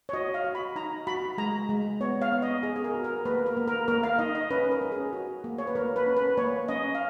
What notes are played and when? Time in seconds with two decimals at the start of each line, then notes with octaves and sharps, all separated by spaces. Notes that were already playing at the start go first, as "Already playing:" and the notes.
0.09 C#5
0.13 F#4 D#5
0.34 F5
0.44 F#4
0.55 B5
0.76 D#4 A#5
1.07 F#4 B5
1.38 G#3 A#5
1.69 G#3
2.00 B3 C#5
2.22 F5
2.32 B3
2.42 D#5
2.63 B3 G#4
2.76 G#4
2.84 A#4
2.94 F#4
3.04 A#4
3.25 A#3 B4
3.46 A#4
3.57 A#3
3.68 A#4
3.88 A#3 A#4
4.03 F5
4.19 D#4 D#5
4.35 D#5
4.50 C#4 B4
4.71 A#4
4.82 C#4
4.92 G#4
5.13 F#4
5.44 A#3
5.58 C#5
5.67 B4
5.75 A#3 A#4
5.96 B4
6.06 C#4
6.17 B4
6.37 A#3 C#5
6.68 C#4 D#5
6.95 F5